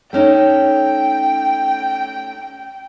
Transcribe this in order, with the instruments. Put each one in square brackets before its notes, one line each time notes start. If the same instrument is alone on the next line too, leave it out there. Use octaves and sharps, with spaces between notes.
[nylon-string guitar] A3 C#4 D#4 [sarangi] G5